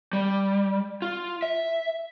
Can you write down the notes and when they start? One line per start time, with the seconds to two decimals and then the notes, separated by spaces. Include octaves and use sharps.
0.13 G3
1.02 F4
1.42 E5